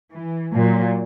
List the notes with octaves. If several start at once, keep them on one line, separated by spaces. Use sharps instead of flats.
E3
A#2 F#3